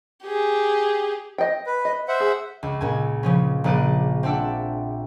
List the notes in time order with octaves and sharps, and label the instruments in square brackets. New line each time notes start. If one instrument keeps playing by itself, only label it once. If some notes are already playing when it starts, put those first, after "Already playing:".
[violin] G4 G#4
[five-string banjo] D#5 G5
[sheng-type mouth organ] B4
[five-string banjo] D#5
[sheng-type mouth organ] C5 E5 F#5
[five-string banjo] G#4
[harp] C#2
C#2 A#2 G#5
C#3 F3 C#4
A#1 C#3 D5 F#6 D#7
C4 D4 D5 E5 F#5